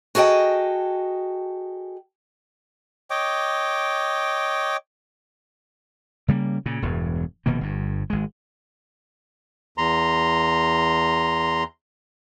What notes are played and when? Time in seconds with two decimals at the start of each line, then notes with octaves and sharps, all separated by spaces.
0.15 F#4 G#4 A4 D#5 G5
3.10 C#5 D#5 G5 D6
6.28 C#3 G3 A#3
6.66 A#2 C#3
6.82 E1 E2 G2
7.46 F1 B2 D#3 A#3
7.61 G1 G2
8.10 G#1 G#3
9.78 E2 A#5 C6